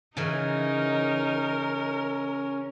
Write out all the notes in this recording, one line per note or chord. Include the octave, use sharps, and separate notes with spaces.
C#3 E3 C#4 D#4 A#4